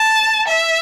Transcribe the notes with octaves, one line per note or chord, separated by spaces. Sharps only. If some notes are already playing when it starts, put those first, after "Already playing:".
Already playing: A5
E5